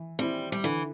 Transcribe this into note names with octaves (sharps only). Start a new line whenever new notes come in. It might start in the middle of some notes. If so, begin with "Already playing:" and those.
Already playing: E3
G3 C4 E4
G3
D3 E3